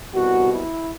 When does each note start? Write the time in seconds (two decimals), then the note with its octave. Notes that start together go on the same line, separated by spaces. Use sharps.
0.13 C2 B2 F#4
0.51 E4